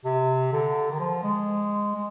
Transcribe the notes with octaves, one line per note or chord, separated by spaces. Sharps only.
C3
D3
D#3
F3
G#3
G#3